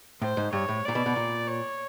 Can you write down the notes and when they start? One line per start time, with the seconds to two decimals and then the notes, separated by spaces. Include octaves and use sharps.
0.22 A2 C5
0.37 G#2
0.53 G2 C#5
0.69 A2
0.85 A#2 D5
0.95 B2
1.06 B2
1.16 A#2
1.47 C#5